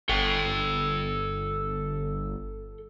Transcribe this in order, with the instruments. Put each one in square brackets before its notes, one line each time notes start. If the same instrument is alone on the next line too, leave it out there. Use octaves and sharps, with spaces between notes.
[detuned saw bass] G1 [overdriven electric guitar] A4 G5